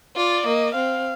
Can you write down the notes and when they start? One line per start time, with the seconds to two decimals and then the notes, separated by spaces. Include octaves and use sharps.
0.16 F4 D5
0.46 A#3 D#5
0.75 C4 F5